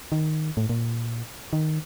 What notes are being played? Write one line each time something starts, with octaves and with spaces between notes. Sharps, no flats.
D#3
A2
A#2
D#3